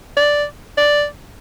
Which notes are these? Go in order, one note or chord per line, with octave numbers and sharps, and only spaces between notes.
D5
D5